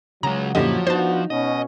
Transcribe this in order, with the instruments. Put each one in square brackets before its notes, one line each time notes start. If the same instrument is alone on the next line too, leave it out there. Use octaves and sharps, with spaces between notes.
[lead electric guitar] C#3 G#3 [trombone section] F#3 [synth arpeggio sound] A#5
[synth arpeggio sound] F#2 D3 D#5 [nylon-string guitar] A#2 E4 G4 [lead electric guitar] F3
[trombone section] B3 D4 F#4 [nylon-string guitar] D#4 [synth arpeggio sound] C5 A5
[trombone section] B2 C#4 [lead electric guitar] D#5